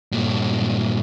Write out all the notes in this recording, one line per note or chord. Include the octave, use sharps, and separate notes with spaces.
G2 A#2